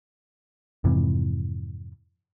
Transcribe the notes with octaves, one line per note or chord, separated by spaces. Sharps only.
F2 G#2 C3 E3